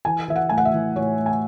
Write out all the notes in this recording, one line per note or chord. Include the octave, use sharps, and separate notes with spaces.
E3 G#5
E3 E5
F#5
A2 G#5
F#5
E5
E3
A2 C#5
A2
G#5